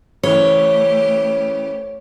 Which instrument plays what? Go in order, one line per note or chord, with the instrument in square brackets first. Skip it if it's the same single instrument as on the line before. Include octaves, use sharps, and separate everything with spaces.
[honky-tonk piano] C#3 E3 [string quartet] A3 G4 [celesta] A4 C5 G7 [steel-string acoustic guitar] C#5